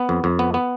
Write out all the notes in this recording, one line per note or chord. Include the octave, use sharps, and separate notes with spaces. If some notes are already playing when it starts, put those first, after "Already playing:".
Already playing: B3
F2
F2
B3
B3